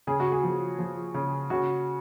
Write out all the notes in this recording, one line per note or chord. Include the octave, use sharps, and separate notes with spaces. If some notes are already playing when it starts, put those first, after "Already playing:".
C#3 G#4
F#4
G#4
F3
F3
C#3
C#3 F#4